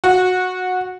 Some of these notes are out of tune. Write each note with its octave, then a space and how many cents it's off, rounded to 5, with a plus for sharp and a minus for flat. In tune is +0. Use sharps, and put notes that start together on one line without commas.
F#4 -15